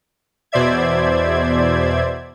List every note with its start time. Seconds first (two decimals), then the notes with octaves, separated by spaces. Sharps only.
0.52 E2 B2 C5 D5 E5 G#6